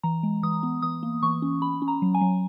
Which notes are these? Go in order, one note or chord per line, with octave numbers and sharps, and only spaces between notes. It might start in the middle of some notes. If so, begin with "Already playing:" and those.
E3 A#5
G#3
E3 D#6
B3
E3 D#6
A#3
E3 C#6
C#4
C#4 B5
C#4
A#5
F#3
G#5
F#3